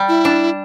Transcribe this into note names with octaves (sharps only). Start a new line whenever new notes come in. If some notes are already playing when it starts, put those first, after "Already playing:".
Already playing: G3
E4
D4